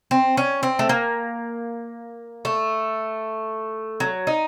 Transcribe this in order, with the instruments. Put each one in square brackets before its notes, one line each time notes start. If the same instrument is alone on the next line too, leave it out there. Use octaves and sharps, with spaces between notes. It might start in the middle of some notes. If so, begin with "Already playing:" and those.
[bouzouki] C4
C#4
C4
A3
A#3
A3
F#3
D#4